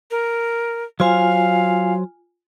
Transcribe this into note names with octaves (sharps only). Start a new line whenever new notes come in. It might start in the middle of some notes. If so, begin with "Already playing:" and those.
A#4
F#3 F4 C5 F5 G#5